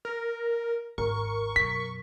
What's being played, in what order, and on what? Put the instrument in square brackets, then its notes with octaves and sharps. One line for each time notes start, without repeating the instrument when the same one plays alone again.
[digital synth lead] A#4
[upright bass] G#1 D#2 [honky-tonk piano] A#4 [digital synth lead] C#6
[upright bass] F#2 B2 [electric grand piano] B6